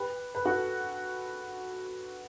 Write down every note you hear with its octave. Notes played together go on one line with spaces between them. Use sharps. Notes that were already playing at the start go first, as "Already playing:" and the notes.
Already playing: G4 B4
B4
F#4 A4